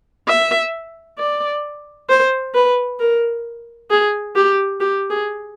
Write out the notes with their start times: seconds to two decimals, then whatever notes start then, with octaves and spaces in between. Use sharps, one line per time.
0.28 E5
1.18 D5
2.09 C5
2.55 B4
2.99 A#4
3.90 G#4
4.35 G4
4.80 G4
5.10 G#4